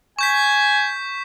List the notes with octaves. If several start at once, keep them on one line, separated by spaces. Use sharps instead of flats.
G#5 C#6 G6 B6